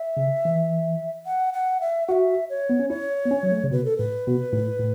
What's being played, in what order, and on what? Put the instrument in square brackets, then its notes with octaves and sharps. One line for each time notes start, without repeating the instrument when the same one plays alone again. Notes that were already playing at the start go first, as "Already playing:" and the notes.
Already playing: [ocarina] E5
[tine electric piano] C#3
E3
[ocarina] F#5
F#5
E5
[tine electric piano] F#4 [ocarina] E5 F#5
[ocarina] C#5
[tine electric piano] B3
C#4
[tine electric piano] E4 [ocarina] C#5
[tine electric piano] B3
C#4
F#3
A3
C#3
[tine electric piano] B2 [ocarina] B4
[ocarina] A4
[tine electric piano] A2 [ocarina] B4
[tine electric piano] B2
A2
A2